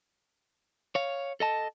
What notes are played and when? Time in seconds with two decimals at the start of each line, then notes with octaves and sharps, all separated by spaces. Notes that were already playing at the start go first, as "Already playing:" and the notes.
0.95 C#5 F5
1.40 A4 D#5 A5